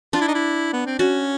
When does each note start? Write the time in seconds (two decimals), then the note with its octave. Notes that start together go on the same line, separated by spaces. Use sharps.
0.13 D4 F4
0.21 E4
0.28 D#4
0.35 E4
0.73 B3
0.86 C4
0.99 C#4 F#4